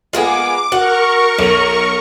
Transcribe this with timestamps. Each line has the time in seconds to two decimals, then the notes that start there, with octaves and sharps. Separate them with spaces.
0.13 G#3 A#3 B3 F4 G#4 D6
0.72 F#4 A#4 F#5 C#6
1.39 B1 F7